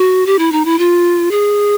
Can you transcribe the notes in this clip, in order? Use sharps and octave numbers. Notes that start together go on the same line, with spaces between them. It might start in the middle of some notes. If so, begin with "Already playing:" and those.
Already playing: F#4
G4
E4
D#4
E4
F4
G#4